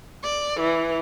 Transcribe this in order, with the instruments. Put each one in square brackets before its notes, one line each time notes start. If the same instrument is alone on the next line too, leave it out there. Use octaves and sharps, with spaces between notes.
[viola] D5
E3